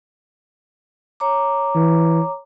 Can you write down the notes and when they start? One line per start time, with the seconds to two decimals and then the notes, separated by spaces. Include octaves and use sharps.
1.20 C#5 A#5 D6
1.75 E3